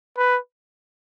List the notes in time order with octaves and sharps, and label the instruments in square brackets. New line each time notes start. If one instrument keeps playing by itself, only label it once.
[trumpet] B4